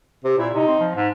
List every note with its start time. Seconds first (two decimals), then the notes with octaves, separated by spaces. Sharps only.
0.24 C3
0.38 A#2 E4
0.53 C3 D#4
0.67 C4
0.80 F3
0.95 G#2